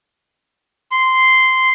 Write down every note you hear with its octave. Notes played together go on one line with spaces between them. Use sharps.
C6